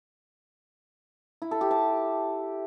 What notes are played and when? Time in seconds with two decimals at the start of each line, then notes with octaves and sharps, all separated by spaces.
1.42 E4
1.51 A4
1.61 G4
1.71 A5